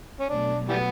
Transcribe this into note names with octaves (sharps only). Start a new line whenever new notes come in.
C#4
B2 F#3 A3 D4
E3 G3 B3